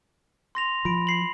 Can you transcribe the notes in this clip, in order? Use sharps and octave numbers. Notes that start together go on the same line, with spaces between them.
C6 A#6 F7
F3 B5 D7
C7 F#7